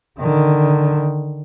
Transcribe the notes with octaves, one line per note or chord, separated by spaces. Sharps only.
D3 D#3